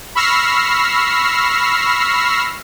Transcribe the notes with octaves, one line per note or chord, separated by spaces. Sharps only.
B5 C#6 E6 F6 A#6 C7